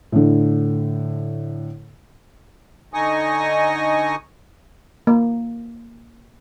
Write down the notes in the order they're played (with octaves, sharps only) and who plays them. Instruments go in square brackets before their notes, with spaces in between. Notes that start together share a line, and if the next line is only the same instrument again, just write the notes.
[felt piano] A2 D3
[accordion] D3 D#4 D#5 G#5 C#6 D#6
[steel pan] A#3